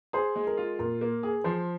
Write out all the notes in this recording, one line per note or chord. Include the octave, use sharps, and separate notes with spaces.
G#4 C5
G#3
A#4
F4
A#2 A#4
A#3
G#4
F3 C5